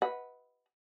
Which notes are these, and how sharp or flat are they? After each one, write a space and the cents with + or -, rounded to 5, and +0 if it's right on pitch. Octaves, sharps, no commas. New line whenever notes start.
B4 +0 D#5 +40 F#5 +0